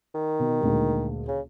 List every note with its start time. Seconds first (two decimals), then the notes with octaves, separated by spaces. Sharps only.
0.14 D#3
0.40 B2
0.61 D2 A#2 G#3
1.28 C#3